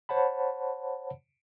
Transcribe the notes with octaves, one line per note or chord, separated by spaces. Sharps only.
C5 C#5 F#5 A5 B5